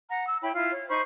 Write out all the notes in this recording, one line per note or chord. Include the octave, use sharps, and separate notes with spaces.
F#5 A#5
E6
E4 C#5 G5 B5
E4 F4
C#5
D#4 C5 B5 C#6